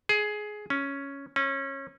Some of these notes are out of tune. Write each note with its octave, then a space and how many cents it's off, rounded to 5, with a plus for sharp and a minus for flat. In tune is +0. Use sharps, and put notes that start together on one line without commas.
G#4 +15
C#4 +0
C#4 -25